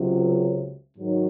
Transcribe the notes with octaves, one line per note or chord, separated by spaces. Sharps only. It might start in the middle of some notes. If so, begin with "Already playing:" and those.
Already playing: C#2 C3 F#3
G#2 D#3 F#3